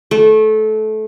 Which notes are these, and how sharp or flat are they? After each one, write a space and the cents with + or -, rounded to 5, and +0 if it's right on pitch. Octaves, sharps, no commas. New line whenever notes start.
A3 -20